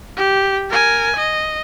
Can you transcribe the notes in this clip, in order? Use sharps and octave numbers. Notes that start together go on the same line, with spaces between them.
G4
A#4 G#5
D#5